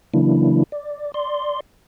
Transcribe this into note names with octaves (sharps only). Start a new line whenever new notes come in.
C#3 E3 F#3 A#3 D4 E4
D5
D5 C6